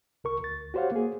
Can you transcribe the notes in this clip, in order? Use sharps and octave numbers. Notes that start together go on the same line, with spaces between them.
C2 A#4 C#6
D2 A6
F#4 G4 C5 C#5 F5 F#5
A#3 G#4